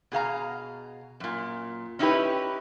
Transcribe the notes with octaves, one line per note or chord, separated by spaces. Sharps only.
B2 G#4 F5 A#5
F#2 A#2
C#4 D#4 E4 F#4 G4 B4